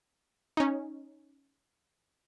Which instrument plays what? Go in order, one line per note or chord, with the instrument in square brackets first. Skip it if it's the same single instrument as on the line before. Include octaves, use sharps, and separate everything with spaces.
[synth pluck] C#4 D#4